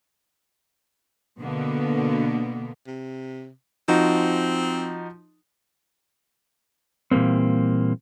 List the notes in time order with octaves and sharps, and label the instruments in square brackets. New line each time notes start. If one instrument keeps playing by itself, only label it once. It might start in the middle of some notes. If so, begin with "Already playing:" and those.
[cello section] B2 D3 A#3 B3
[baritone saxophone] C3
[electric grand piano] F3 D#4 F#4 [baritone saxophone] C4
[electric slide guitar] A#2 E3 G3 A#3 C4